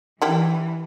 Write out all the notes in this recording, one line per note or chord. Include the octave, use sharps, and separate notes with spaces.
E3 G3 E4 G5